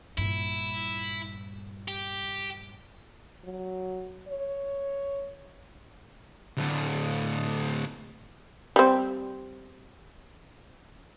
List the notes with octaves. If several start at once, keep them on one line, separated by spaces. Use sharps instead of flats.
G2 A#2 E4
G4
F#3
C#5
D2 A2
G3 C4